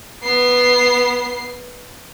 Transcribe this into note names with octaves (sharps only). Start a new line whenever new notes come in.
B3 C7